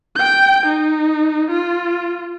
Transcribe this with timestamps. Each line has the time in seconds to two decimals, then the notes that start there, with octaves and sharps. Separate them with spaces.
0.15 G5 G6
0.66 D#4
1.51 F4